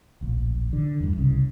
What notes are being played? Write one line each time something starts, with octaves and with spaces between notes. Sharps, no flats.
D1 A#1
D3
E2 G2
F1 C2 C#3